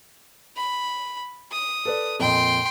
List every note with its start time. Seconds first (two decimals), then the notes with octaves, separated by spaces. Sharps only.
0.56 B5
1.52 D#6
1.85 A4 B4 D5
2.20 F2 A#2 D#5 G5 C6